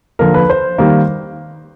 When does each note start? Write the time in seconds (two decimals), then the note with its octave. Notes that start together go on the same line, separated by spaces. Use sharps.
0.19 D3 F3 A#3 A#4
0.34 B4
0.50 C5
0.78 D#3 G3 A#3